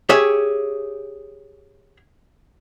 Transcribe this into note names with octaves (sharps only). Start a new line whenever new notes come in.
G4 G#4 C#5 E5